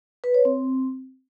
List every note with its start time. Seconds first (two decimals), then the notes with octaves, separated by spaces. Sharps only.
0.24 B4
0.34 C#5
0.45 C4